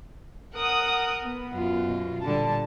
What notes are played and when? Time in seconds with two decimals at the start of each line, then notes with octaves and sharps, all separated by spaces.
0.55 A#4 F#5 D#6
1.23 B3
1.54 F#2 F4
1.87 B2
2.23 A#2 D3 G3 A5